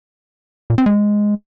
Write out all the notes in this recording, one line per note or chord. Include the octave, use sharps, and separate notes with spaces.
A#2
C4
G#3